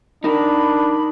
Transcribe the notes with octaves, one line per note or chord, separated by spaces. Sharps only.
D4 D#4 A#4 B5